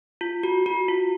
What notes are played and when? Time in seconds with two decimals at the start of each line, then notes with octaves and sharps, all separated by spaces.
0.21 F4
0.43 F#4
0.66 F#4
0.88 F4